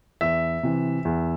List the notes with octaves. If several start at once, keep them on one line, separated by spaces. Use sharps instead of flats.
E2 E5
C3 E3
E2